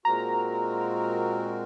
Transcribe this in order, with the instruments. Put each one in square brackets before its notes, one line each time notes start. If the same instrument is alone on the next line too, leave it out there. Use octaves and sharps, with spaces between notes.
[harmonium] A#2 G#3 C4 F#4 A#4 [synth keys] A#5